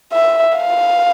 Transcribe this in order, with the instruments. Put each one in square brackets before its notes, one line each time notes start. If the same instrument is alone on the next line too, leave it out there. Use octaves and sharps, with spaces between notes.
[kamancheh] E5
F5